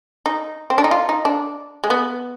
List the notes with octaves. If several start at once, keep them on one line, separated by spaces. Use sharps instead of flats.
D#4
C4
D4
D#4
F4
D#4
D4
G#3
B3